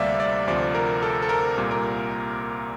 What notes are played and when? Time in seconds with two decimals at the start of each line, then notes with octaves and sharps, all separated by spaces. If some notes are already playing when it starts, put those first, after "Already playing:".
Already playing: D2 C3 G3 A#3 D5 E5 F5
0.20 D5
0.47 D2 C3 F3 D5
0.75 A#4
1.03 A4
1.22 A4
1.29 A#4
1.56 C2 A#2 G3 A#3
1.71 A#4